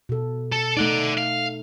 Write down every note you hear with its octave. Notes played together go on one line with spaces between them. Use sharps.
B2 A4
A4
A3 D#4 D5 F#5
F5